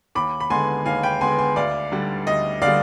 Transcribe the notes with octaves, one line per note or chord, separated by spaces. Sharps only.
D#2 B5 D6
B5
D3 G#3 B3 G#5 C6
D#2 F5 G#5
G5 B5
D3 G#3 B3 G#5 C6
G#5 C6
D2 D5 F5
D3 G3
D2 D#5
D3 D5 F5
G3